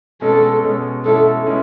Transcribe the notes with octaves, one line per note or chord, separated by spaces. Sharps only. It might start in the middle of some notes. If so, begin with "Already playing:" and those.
B2 G#3 C#4 A4
B2 G#3 C#4
B2 G#3 C#4 E4 A4
B2 G#3 C#4 E4